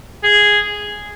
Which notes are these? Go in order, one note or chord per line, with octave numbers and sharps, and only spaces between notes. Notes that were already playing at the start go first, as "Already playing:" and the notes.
G#4